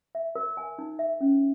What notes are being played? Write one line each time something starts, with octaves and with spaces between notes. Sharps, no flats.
E5
A#4
G#5
D#4
E5
C#4